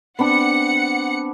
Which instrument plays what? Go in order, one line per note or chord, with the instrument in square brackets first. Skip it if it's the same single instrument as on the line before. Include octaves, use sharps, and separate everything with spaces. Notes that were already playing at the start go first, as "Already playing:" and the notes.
[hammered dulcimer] B3 C4 D4 [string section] F#5 C#7